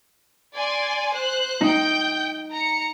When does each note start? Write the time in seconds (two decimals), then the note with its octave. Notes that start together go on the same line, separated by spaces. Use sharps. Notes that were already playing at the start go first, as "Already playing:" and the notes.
0.54 D5 G#5 C6
1.13 C5 F#6
1.61 D#4 G5 G6
2.50 A#5 C#7